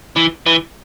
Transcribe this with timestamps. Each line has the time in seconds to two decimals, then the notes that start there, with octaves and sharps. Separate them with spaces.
0.17 E3
0.46 E3